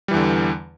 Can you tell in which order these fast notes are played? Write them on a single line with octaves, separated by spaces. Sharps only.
G3 E3 E2 D3